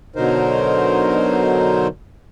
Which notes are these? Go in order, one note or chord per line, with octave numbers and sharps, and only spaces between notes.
B2 D3 F#3 D#4 A#4 C5